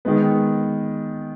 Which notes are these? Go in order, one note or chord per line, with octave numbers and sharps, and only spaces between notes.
D#3 G#3 B3